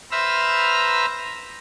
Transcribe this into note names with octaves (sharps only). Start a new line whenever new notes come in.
B4 C5 E5 A#5 E6 F6